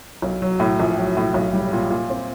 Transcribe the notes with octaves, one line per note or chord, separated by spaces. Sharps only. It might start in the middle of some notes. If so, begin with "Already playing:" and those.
B1
F#3
A2
A#1
F#3
A2
B1
G3
A#2
A#2
C4